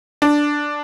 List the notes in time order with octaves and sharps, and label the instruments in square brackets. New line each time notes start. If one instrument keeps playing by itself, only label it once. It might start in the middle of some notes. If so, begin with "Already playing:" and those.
[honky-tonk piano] D4